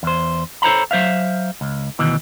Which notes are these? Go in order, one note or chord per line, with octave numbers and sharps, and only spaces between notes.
E2 C5
A4 C5 C#5 A#5 B5
F#3 C5 E5 F5
C#2
D2 B2 D#3 E3